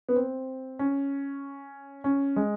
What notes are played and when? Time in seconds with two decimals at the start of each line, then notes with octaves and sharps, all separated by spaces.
0.09 B3
0.16 C4
0.79 C#4
2.04 C#4
2.36 G#3